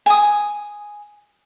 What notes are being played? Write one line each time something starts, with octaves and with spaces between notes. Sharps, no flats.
G#5 D#6